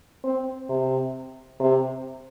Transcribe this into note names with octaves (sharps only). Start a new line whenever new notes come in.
C4
C3
C3